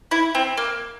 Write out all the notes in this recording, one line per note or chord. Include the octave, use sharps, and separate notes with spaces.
E4
C4
A#3